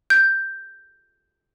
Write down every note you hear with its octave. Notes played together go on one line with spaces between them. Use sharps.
G6